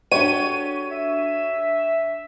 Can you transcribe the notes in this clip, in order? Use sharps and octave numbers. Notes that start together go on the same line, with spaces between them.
D4 F#4 G4 A4 C#5 D#7
E5